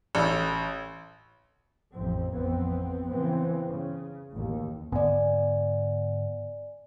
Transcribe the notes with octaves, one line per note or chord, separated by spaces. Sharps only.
A1
A1 F2 C4
A1 F2 B3 C4
C#3 E3 B3 C4
C#3
A1 D#2
G#2 D3 B3 D5 G#5